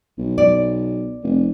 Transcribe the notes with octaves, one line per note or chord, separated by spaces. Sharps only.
B1
D5
F1